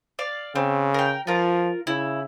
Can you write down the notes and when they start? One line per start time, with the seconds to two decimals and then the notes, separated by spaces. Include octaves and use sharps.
0.19 D5 F5
0.55 C#3 C4
0.94 A#4 G5
1.27 F3 F4 A#4
1.87 C#3 E4